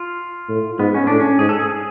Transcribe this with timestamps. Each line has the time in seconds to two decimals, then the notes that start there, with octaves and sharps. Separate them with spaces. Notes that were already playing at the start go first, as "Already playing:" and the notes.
Already playing: F4
0.49 A2
0.79 G#2 B3
0.94 C#4
1.07 A2 D4
1.20 C#4
1.39 G#2 G#4
1.49 A4
1.59 G#4
1.69 G#4